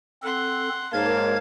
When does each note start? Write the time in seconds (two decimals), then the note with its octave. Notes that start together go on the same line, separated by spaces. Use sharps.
0.23 C4 A4 F#5 C6
0.94 G#2 A#3 A#4 C#5 F5 A5 G#6